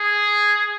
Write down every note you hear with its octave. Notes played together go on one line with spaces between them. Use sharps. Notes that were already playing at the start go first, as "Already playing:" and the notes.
Already playing: G#4